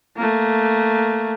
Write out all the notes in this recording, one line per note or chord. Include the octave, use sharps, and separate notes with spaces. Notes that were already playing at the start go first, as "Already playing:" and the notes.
A3 A#3